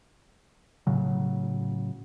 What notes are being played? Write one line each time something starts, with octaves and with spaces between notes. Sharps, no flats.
A2 C#3 F#3